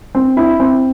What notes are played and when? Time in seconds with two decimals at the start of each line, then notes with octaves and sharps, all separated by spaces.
0.15 C4
0.37 E4
0.60 C4